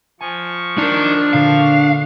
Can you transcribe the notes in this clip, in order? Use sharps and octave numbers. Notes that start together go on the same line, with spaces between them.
F3 G#5 C#6
D4 D#4 A#4
A#2 D3 F5